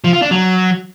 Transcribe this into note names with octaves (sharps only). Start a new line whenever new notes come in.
F3
F4
D4
F#3